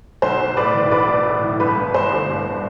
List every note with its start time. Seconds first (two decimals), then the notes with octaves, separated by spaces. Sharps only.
0.22 B1 C5
0.41 B1
0.57 A2 B4 D5
0.74 E3
0.91 B1 B4 D5
1.08 B1
1.25 A2
1.43 E3
1.60 G1 B4
1.77 G1
1.94 G2 C5
2.12 D3
2.28 G1